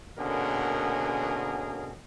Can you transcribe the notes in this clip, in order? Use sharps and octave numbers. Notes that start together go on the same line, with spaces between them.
B2 D3 A#3 C#4 G#4 A#4